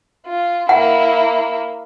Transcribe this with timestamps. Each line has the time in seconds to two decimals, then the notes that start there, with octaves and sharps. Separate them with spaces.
0.27 F4
0.69 A#3 E4 F#5